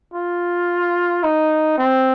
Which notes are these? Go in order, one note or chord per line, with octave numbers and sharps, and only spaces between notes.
F4
D#4
C4